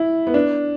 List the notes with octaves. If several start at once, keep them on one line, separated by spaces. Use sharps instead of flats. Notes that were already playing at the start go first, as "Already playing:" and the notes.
Already playing: E4
B3
D4